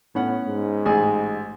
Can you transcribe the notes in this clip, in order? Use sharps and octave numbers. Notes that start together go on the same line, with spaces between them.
A2 B3 C#4 F#5
G#2
A1 G#4 G#5